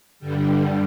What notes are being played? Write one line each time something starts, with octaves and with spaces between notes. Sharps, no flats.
G2 D3 G3